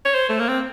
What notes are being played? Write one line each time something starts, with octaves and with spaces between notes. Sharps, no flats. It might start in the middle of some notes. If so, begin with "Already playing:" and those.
C#5
C5
A3
A#3
C4